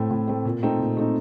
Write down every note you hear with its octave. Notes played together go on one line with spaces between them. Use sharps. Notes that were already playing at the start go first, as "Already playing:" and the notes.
Already playing: A2 A3 C4
A2
A3 C4
A#2
A3 C4 D#4
A#2
A3 C4 D#4